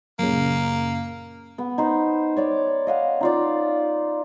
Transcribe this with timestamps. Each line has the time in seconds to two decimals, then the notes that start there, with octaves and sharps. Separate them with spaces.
0.19 F#2 A#2 C#3 A#3
1.58 B3
1.78 D#4 C5
2.37 C#5 D5 D6
2.87 D#5 F5 F#5
3.21 D#4 F4 D5